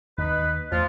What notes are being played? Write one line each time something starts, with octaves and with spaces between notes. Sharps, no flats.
D#2 D#4 B4
E2 F3 A3 F4